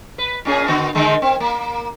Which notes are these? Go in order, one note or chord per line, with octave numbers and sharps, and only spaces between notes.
B4
A#2 C#4 G#4
D3 B3 F#4
D3 D#3 G#3
C4
A#3